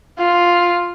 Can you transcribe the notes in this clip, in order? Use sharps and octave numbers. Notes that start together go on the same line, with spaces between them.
F4